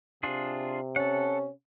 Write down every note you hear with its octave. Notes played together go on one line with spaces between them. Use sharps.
C3 D4 F4 G#4
C#4 A4 F#5